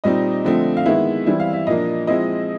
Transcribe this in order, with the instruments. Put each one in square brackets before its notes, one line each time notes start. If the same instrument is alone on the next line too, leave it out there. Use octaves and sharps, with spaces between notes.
[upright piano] A#2 G3 C4 D#4 D#5
D3 F3 A3 C4
F5
D#3 G#3 B3 E4 E5
E3 G3 C4 E4
F5
E5
A#2 F3 A#3 D4 D#5
F3 G#3 C4 E4 D#5